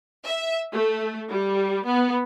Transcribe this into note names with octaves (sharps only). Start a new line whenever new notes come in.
E5
A3
G3
B3